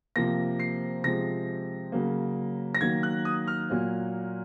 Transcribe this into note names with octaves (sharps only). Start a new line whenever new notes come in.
C3 F3 A#3 A#6
C7
C3 F3 G#3 A#6
C#3 F#3 A#3
A#6
D#3 F#3 A#3 G#6
F#6
D#6
F6
A#2 F#3 A#3